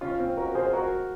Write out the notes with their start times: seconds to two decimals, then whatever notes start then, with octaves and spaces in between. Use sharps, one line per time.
0.01 C#4 F4
0.19 C4
0.37 F#4 A#4
0.55 G#4 C5
0.73 F#4 A#4